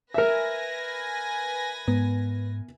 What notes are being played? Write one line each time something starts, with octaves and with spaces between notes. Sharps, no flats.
A#4 B4 E5 G#5 A#6
G#2 B3